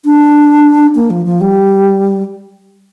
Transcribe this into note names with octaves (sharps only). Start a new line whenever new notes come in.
D4
A#3
F3
F3
G3